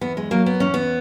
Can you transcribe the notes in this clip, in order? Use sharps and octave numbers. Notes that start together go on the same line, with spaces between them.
E2 B3
G#3
F#3 A#3
B3
E2 C#4
B3